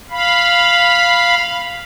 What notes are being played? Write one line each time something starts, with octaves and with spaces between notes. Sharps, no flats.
F5 B5